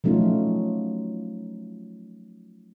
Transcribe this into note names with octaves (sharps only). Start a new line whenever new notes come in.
F3 F#3 A3 C#4 D#4 F4